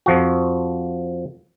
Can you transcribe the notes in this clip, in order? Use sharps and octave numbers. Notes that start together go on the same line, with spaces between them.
F2 F3 F#4